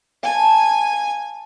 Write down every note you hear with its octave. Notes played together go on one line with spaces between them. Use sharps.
F5 G#5 A5